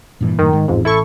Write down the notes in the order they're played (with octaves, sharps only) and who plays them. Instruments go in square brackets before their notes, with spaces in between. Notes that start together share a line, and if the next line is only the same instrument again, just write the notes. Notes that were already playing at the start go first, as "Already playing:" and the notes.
[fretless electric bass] G2 A#2 E3
[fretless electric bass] F#2 A2 [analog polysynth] D#3
[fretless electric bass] G#2
[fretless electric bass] A1 [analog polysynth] F2 G#2
[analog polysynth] E4 A4 C#6